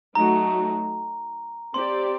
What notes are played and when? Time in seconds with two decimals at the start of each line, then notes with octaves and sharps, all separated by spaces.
0.15 F#3 A3 D#4 F#4 A#5
1.74 C4 G4 D5 C6